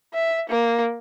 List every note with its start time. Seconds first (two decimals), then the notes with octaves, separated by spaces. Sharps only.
0.14 E5
0.50 A#3